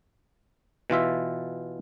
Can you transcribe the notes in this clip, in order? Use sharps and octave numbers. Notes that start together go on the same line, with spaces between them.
B2 E3 F4 E5